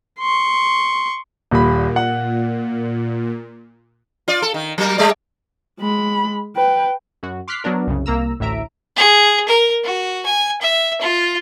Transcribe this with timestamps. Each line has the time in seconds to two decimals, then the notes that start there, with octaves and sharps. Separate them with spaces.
0.19 C6 C#6
1.51 D#1 A#2 B5
1.96 F#5
4.28 F4 D5
4.42 A4
4.54 D#3
4.78 F#3 A#3 A#4
4.98 G3 A3 D5
5.81 G#3 B5
6.56 B4 G5
7.23 F#2 F#4
7.48 C6 D6 F6 F#6 B6 C7
7.64 F#3 B3 D4 A#4
7.87 C2 F#2 C#3
8.06 C2 A#3 A#5 E6
8.40 A1 D2 A2 E5 A#5 D7
8.96 G#4
9.48 A#4
9.84 F#4
10.26 G#5
10.61 E5
11.01 F4